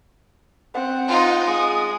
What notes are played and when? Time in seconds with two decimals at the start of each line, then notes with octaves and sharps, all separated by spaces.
0.74 C4 F#5
1.08 D#4 F4
1.47 G#3 D#6